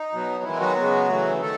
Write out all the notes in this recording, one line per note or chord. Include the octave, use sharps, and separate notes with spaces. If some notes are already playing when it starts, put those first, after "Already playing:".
Already playing: D#4
B2 F#3 B3
D#3 E3 G#3 B3 E4
F#3 F#4
C#3 G#3 B3
C#3 E3 A3
D#3 A3 A4